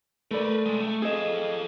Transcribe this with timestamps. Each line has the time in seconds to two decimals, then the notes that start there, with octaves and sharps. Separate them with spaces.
0.31 A3 A#4 B4 D5
0.66 C3 G#3
0.80 A3
1.02 C4 G#4 A4 D#5